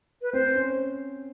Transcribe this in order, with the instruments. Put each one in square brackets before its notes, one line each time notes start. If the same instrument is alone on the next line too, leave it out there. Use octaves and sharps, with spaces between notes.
[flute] B4
[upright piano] C4 [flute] C5
[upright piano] C#4